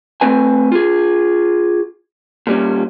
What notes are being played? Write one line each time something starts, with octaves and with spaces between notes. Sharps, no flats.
A3 C4 B4 G#5
F4 G#4
A#2 G3 C#4